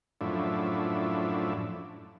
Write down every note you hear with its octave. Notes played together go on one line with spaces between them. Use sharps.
F#2 A2 F3 D4 E4